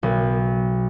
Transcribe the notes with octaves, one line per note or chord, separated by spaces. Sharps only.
B1